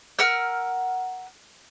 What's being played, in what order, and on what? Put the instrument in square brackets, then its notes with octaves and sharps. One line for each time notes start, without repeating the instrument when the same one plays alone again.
[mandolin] A#4 F#5 E6 F6